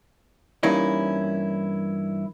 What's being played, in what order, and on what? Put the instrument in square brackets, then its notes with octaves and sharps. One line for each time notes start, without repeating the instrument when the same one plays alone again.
[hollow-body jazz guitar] G2 E3 A#3 C#4 D#4 E4